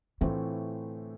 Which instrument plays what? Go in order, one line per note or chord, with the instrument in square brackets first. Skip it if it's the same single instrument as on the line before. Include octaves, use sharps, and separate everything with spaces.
[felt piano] A2 E3 A3 C4 F4 [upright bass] D3